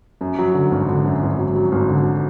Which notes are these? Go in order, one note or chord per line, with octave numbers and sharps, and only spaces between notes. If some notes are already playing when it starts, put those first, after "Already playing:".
F#2
F#3
D3
G#1
D3
F#2
G#1
F#3
F#3
G#1
D3